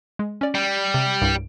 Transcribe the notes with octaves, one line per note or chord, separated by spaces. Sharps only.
G#3
C#4 D5
G3
C3
C2 G2